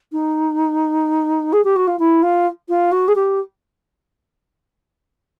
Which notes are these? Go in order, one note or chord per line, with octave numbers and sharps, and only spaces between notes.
D#4
G#4
G4
F#4
F4
E4
F4
F4
F#4
G#4
G4